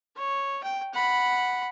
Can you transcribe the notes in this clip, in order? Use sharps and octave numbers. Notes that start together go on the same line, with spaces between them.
C#5
G5
F#5 B5